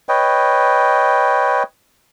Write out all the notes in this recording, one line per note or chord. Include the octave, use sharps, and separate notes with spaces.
B4 C#5 D#5 G5